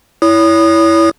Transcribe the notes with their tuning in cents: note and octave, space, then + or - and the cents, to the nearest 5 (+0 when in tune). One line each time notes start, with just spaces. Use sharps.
E4 +0 C#5 +35 D#6 -20